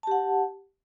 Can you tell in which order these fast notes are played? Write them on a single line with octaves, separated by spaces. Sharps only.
A5 G4 F#5